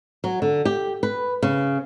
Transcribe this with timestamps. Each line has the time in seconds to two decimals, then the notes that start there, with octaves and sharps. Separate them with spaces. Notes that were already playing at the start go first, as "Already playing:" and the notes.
0.24 F#3
0.42 D3
0.65 G4
1.03 B4
1.42 C#3